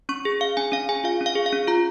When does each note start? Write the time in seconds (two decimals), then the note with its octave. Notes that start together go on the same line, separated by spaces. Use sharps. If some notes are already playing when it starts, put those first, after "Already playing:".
0.09 C#4 C#6
0.25 G#4
0.40 G#4 F5
0.57 C#4 G#5
0.72 C#4 F5
0.89 G#4 G#5
1.04 F4 F5
1.21 C#4
1.26 F5
1.35 G#4
1.46 F5
1.53 C#4
1.67 F4 A#5